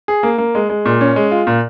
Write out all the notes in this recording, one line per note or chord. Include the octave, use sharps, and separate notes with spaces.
G#4
A#3
A#3
G#3
G#3
A#2
C#4
G#3
F4
A#2